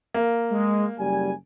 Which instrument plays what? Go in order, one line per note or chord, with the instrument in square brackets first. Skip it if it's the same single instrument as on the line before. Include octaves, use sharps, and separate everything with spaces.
[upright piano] A#3
[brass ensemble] G#3
F#1 G3 G#5